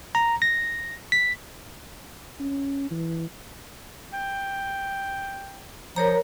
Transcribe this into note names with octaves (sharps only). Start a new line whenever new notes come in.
A#5
A#6
B6
C#4
E3
G5
F3 A#4 C#5 A#5